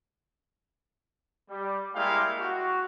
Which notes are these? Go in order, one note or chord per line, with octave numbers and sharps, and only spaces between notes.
G3
G3 G#3 A#3 E4 F5 G5
F#4